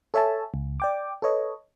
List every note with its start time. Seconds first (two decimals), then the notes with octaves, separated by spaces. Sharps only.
0.14 A4 C#5 E5 G#5 A5
0.54 C#2
0.80 D5 G5 D6
1.22 A4 B4 C#5 D#5